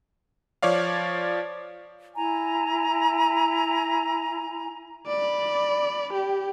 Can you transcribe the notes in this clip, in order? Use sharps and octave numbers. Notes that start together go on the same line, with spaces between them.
F3 C#5 D5 F5
E4 G#5 A#5
D5 B5
G4